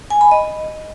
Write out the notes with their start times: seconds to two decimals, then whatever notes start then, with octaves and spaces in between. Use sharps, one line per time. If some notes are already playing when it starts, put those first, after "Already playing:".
0.10 G#5
0.21 B5
0.31 D#5